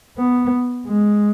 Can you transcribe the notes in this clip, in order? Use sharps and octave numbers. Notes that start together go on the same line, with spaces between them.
B3
G#3